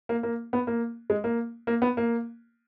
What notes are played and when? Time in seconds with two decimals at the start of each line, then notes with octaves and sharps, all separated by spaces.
0.09 A#3
0.23 A#3
0.53 B3
0.67 A#3
1.10 G#3
1.24 A#3
1.67 A#3
1.82 B3
1.97 A#3